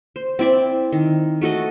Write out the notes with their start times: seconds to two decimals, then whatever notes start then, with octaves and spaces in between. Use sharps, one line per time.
0.16 C5
0.39 C4 E4 D5 E5
0.92 D#3
1.41 A3 F#4 A4 D#5